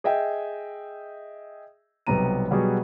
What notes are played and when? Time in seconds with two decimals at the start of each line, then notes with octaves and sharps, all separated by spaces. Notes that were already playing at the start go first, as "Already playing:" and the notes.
0.04 G#4 D#5 E5 G5
2.07 B1 C3 G3 B3 A#5 D#7
2.51 B2 F#3 G3 B3 F#4 G#4